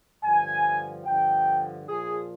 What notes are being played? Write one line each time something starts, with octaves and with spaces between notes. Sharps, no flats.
G2 D3 F3 G#5
G2 D3 F3 G5
A#2 F3 G#4